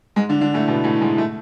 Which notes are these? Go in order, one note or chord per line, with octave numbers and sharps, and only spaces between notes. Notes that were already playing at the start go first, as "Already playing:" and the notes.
G#2 G#3
D3 D4
D3 D4
A2 A3
B2 B3
A2 A3
G#2 G#3
A2 A3